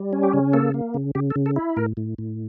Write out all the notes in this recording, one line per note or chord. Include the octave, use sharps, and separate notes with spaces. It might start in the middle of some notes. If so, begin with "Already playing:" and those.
Already playing: G3
C#4
G4
C#3
A#3 A4
A#3
C#3
C#3 G4
A4
C#3
A4
E4
A2 A#4
A2
A2